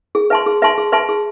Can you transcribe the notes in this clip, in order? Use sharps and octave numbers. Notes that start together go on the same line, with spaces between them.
G#4
B4 E5 A5 C6
G#4
B4 E5 A5 C6
G#4
B4 E5 A5 C6
G#4